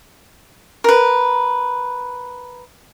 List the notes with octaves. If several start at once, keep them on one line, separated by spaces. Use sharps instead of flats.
A#4 B4